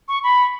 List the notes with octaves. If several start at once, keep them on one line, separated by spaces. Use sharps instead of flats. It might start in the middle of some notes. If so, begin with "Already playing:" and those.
C#6
B5